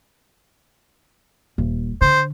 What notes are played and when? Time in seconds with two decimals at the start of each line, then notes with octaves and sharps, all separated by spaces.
1.58 D#1
2.01 D3 C5